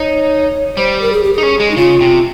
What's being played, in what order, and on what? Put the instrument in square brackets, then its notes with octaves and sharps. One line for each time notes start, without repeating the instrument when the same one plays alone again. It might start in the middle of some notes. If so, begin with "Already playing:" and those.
Already playing: [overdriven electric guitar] D#4 [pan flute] C#5
[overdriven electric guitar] G3 [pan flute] C5
[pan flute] A#4
G#4
G4
[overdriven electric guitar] D#4 [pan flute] G#4
[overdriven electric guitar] C#4
G#3
[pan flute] D#4
[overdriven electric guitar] C#3 [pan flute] F4
[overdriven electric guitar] C3